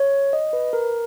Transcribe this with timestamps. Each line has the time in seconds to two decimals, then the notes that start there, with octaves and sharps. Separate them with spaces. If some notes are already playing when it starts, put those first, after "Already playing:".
Already playing: C#5
0.33 D#5
0.53 B4
0.73 A#4